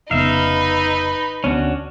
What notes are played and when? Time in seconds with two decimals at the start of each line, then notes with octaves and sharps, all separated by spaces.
0.11 F1 C#3 B3 D#4 B4 E5 F5
1.44 D2 B3 C#4 D4 F#4